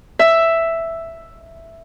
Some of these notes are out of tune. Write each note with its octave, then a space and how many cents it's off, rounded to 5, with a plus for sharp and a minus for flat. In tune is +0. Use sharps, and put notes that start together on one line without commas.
E5 +5